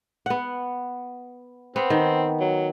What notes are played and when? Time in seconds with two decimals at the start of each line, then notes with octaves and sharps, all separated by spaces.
0.26 B3 F#5
1.76 B3 C4
1.90 D#3
2.40 F#3